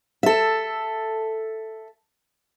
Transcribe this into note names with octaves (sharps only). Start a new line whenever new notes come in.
A4 E5